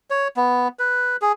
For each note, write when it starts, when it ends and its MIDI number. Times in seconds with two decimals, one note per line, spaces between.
0.10 0.28 73
0.36 0.68 59
0.79 1.16 71
1.22 1.32 68